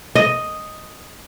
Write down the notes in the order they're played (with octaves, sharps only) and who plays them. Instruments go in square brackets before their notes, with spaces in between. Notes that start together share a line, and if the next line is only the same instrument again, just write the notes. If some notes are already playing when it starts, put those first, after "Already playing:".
[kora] D#5